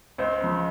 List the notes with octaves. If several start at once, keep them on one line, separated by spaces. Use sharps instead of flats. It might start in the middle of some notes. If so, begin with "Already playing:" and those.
C#2 C5
C#3 F3